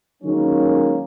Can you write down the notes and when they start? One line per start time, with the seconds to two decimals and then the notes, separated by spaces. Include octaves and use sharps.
0.23 D#3 F#3 G#3 A#3 C#4